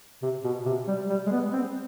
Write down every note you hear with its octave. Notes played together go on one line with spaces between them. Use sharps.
C3
B2
C3
G3
G3
G#3
B3
C4